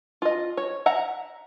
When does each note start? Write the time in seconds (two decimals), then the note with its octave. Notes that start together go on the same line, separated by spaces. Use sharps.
0.22 F4 D#5
0.57 C#5
0.86 E5 F#5 A#5